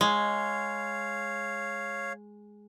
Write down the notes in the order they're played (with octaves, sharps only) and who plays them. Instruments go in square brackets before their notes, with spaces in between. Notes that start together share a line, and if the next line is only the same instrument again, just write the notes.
[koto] G#3 [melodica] C#5 F5